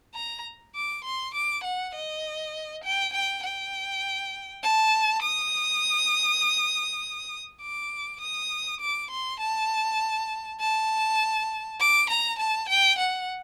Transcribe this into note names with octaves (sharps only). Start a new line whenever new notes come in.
A#5
D6
C6
D6
F#5
D#5
G5
G5
G5
A5
D#6
D6
D#6
D6
C6
A5
A5
D6
A#5
A5
G5
F#5